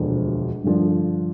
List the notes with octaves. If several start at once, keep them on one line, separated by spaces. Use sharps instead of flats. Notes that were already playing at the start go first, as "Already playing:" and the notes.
Already playing: E1 D2 D3 F3
G2 D3 F3